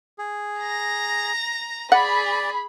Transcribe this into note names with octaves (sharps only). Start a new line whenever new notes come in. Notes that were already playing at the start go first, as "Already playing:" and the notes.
G#4
A#5 A#6
G#4 D5 F#5 B5